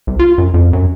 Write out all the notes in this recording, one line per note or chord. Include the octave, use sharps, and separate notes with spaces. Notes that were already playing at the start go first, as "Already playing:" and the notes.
C2
F4
F#2
F2
F#2